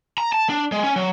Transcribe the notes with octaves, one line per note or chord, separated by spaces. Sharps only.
A#5
A5
D4
G#3
C#4
F#3